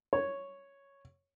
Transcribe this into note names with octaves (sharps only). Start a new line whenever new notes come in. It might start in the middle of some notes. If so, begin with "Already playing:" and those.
C#5